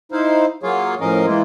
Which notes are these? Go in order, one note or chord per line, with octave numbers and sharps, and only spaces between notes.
D#4 E4 C5 F5
F#3 A#3 F4 G#4 C#5 F5
A2 F3 C#4 A#4 D#5 F5
E3 G#3 A#3 E4 F4